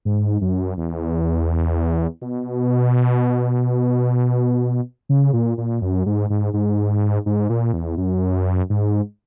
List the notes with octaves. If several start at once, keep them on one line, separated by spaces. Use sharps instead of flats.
G#2
F#2
E2
B2
C#3
A#2
A#2
F#2
G#2
G#2
G#2
G#2
A#2
E2
F#2
G#2